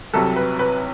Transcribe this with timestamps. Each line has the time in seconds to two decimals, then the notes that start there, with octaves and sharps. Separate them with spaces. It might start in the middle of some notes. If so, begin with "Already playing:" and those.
0.14 C2 C3 F#3 A4
0.36 B4
0.59 B4